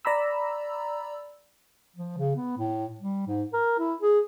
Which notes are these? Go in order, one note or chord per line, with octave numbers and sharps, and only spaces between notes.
D5 A#5 B5 E6
F3
C#3
B3
A2
G3
G#2
A#4
E4
G#4